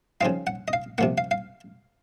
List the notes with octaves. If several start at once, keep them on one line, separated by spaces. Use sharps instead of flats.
C#3 F3 C4 D#4 F5
F#5
D#5
F5
C3 F3 A#3 F#5
F5
F5